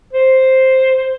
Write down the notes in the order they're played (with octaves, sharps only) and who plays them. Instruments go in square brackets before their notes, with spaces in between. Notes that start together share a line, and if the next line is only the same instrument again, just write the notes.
[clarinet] C5